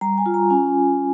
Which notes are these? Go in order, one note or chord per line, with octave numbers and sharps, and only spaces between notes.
G3 A#5
G#5
F4
A#5
C#4 G#5